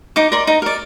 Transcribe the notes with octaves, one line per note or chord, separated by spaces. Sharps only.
D#4 D6
A#4 D5 C6
D#4 A#5
A#4 D5